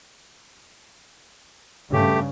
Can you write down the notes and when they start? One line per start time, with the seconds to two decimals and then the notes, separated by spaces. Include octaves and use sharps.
1.93 G2 C#3 A3 G4